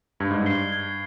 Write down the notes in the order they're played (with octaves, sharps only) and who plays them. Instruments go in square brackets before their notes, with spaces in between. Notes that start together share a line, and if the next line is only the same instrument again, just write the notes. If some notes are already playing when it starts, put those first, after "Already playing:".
[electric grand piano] G2 [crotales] G#6
[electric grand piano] G#2
[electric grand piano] G2 [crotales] C7 G7
[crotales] G#6